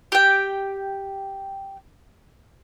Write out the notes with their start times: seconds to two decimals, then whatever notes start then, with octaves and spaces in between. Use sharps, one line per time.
0.12 G4 G5